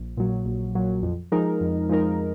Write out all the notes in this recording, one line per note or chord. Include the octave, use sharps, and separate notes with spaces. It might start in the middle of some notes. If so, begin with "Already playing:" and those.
Already playing: A#1
A#2 F#3
A#1
A#2 F#3
F2
F3 G#3 D#4 A#4
F2
F3 G#3 D#4 A#4